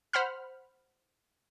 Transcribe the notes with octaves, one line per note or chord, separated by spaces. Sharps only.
C5 F#5 B5 F6